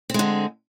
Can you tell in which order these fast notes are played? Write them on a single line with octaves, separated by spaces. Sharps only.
C4 G#3 D3